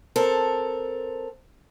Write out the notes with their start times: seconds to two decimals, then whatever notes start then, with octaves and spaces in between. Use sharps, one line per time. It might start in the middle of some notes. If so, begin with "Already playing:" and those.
0.16 C4 A4 A#4